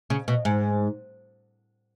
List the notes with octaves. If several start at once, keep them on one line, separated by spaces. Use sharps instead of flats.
C#3
B2
G#2